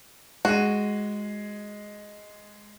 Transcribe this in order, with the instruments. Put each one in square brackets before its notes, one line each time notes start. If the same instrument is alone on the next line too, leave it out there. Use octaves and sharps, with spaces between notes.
[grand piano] G#3 D#7 [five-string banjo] F#4